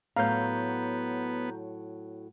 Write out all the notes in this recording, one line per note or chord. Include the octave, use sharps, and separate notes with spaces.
A2 F#3 B3 F5 A#5 G6